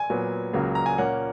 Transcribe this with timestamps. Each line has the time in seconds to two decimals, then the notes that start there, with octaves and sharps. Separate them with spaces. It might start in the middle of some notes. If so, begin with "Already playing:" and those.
Already playing: G#5
0.10 A#2 F#3 B3
0.53 C#2 C#3 F#3 A#3
0.75 A#5
0.86 G#5
0.98 A#2 A#3 C#4 F#5